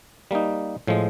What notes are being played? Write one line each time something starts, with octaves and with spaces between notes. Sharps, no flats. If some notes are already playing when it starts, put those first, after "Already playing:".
G3 A#3 D#4
A2 F3 G#3